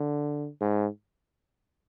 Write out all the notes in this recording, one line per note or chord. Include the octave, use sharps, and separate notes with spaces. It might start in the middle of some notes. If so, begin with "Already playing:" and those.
Already playing: D3
G#2